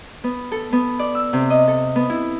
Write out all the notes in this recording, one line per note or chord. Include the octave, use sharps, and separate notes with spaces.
B3
A4
B3
D5
E6
C3
D#5
A4
B3
E4